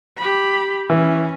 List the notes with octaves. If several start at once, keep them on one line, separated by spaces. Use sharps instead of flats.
G4 B5
E3 C#4